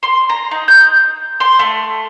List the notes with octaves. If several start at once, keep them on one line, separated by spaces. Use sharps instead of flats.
C6
A#5
D#4
G6
C6
A3